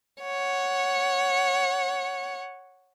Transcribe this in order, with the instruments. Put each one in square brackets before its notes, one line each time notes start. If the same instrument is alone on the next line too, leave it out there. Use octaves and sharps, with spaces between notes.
[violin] C#5 F#5